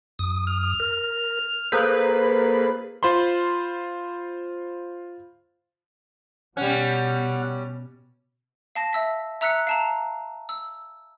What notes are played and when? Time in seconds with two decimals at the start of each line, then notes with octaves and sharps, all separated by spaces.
0.19 F#2 D#6
0.47 F6
0.80 A#4
1.72 A#3 G#4 A4 B4 C5
3.03 F4 C5 B5 C6
6.57 B2 G3 C#4 F#5 F6 F#6
8.75 F5 A5 A#6
8.93 E5 E6 B6
9.41 E5 A#5 E6 F#6 B6 C#7
9.67 F5 A5 A#5
10.49 E6